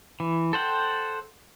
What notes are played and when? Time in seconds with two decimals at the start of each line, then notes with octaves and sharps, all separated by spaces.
0.20 E3
0.53 A4 C5 F#5 G5